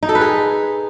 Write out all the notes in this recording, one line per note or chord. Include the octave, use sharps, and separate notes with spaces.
D#4
A4
B4
G#4